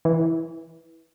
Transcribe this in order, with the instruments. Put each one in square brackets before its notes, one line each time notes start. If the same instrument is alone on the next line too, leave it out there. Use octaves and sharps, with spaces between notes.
[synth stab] E3